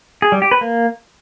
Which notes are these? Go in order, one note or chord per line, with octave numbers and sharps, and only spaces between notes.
G#4
G3
G4
B4
A#3